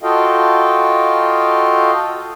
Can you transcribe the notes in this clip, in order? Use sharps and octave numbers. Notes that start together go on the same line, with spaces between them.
F4 F#4 A4 D#5 F5 G5